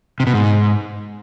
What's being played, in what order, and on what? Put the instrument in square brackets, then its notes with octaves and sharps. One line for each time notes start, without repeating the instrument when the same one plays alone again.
[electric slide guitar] C3
B2
G#2